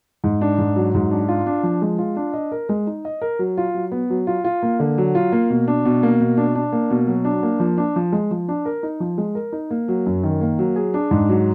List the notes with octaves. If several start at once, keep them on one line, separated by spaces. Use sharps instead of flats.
G#2
D4
G#2
F#3
G#2
D4
F4
D4
F3
G#3
F4
D4
D#5
A#4
G#3
D#4
D#5
A#4
F#3
F4
F#3
B3
F#3
F4
F4
A#3
D3
F#3
F4
A#3
B2
D4
B2
A#3
B2
D4
D4
A#3
B2
F#3
D4
A#3
F3
D4
F3
G#3
F3
D4
A#4
D#4
F3
G#3
A#4
D#4
A#3
F#3
F#2
D#3
A#3
F#3
G#4
D4
G#2
F#3